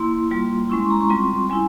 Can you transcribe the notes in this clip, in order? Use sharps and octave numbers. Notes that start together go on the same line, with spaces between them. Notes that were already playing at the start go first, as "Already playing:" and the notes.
Already playing: A#3 E4 C6
G3 A#3 F4
G#3 C#4 E4 C#6
C6
A#5
C#6
G3 C4 F4 C6
G3 C#4 E4 G#5